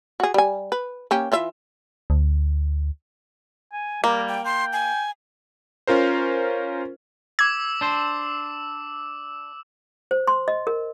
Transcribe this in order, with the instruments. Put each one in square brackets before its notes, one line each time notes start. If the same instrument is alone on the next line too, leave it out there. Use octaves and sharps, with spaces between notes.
[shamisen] F#4 G#4
G3 G#5
B4
A#3 C#4 G4
E3 F4 E5
[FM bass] D2
[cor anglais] G#5
[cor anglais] G3 [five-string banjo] A#3 [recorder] A#4
[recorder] G5
[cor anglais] G5 [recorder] C6
[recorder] G#5
[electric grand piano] C#4 F4 A#4 C5
[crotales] D6 E6 [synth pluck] G#6
[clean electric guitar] D4 C5
[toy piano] C5
C6
D#5
A#4